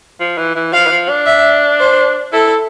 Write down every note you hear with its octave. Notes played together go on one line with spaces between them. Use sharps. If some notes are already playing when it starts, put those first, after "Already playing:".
F3
E3
E3
F3 F5
E3
F3
D4
E5
C5
E4 A4